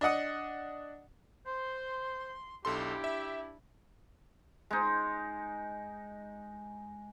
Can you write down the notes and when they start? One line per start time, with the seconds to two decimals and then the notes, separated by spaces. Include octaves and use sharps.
0.01 D4 D#5 F#5 D#6
1.47 C5 C6
2.65 B1 D4 E4 G4 A4 C6
3.04 E5
4.70 G#3 D#4